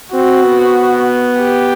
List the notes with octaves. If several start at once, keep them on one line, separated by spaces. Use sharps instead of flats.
C4 F#4
B3
G4